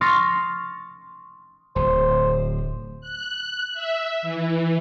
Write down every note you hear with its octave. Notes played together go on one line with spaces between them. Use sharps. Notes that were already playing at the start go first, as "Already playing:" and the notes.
C6 C#6 D#6 F6 A6 A#6
D1 C5
F#6
E5
E3